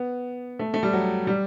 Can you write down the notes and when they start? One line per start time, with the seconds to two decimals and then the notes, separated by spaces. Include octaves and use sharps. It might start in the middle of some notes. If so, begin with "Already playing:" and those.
Already playing: B3
0.59 A3
0.74 A3
0.83 G3
0.93 F#3
1.27 G3